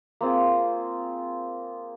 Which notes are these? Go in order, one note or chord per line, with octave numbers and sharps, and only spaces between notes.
A#3 C4 F4 G#4